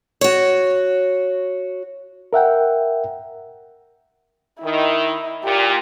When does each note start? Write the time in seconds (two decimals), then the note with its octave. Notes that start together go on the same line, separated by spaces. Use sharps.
0.21 F#4 C#5
2.33 A#4 E5 F#5 G5
4.63 D#3 E4
5.44 A#2 G4